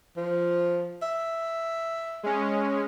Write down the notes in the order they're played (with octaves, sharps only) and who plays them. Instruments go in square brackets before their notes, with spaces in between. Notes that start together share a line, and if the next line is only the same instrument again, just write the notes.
[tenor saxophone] F3
E5
[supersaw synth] G#3 C#4